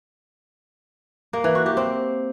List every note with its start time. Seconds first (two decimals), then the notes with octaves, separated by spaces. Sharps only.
1.33 A#3
1.44 E3
1.55 F#4
1.66 G4
1.77 C4